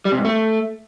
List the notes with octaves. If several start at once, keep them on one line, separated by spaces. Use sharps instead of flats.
G3
C3
G#2
A3